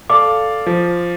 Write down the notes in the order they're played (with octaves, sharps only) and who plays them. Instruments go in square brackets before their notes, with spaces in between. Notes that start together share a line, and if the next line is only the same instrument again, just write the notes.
[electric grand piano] A4 D5 F5 [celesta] D6
[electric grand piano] F3